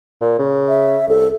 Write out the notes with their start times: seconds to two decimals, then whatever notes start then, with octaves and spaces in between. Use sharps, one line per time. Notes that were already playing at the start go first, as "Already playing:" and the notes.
0.21 A#2
0.39 C#3
0.68 E5
1.09 C2 A4